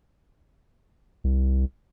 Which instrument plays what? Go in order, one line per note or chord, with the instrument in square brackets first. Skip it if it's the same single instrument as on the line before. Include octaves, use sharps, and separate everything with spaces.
[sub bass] C2